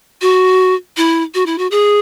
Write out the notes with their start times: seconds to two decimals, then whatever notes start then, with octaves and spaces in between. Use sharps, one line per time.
0.22 F#4
0.97 E4
1.34 F#4
1.46 E4
1.58 F#4
1.71 G#4